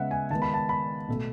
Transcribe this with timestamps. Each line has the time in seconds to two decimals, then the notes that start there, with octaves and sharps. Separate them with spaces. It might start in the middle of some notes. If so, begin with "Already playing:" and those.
Already playing: C#3 G#3 B3 E5 F#5
0.11 G#5
0.30 D#3 G#3 B3 A5
0.42 B5
0.54 A5
0.69 B5
1.08 B2 A3